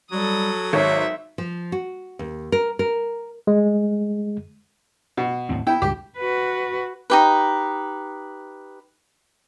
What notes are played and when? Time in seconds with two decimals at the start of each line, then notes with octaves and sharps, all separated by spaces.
0.11 F#3 G3 A4 D#6
0.73 G#1 C#5 E5
1.38 F3
1.72 F#4
2.19 D#2
2.52 A#4
2.79 A#4
3.47 G#3
5.17 B2
5.49 D#2 A2 C4
5.67 B3 E4 G5
5.82 C#2 G2 G4
6.17 F#4 B4
7.10 D#4 G4 B4